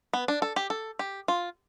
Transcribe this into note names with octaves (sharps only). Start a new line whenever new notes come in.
B3
D4
A4
G4
A4
G4
F4